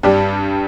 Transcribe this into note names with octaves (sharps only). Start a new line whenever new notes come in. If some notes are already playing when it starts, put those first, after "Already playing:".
G2 G3 D4 G4